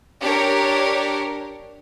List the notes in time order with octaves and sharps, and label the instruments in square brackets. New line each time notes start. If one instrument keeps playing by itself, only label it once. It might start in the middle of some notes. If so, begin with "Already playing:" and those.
[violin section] D4 G4 A#4 C#5